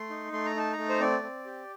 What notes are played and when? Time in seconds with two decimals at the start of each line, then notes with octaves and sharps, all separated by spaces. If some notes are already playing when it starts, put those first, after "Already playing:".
Already playing: A3 C6
0.10 D#4
0.32 A3 C6
0.45 A#5
0.55 D#4 A5
0.73 A#5
0.78 A3
0.89 C5
1.00 C4 D5
1.23 C4
1.46 G4